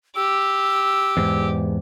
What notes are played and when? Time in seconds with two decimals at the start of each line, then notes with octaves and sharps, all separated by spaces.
0.16 G4 E6
1.17 E2 G#2